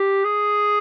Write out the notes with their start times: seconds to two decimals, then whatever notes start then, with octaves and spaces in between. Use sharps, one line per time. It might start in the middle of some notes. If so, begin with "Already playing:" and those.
Already playing: G4
0.24 G#4